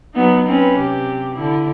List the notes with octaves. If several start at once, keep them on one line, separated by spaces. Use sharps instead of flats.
F#3 B3 D#4
C4 C#4 B4
C3 G4
D3 E4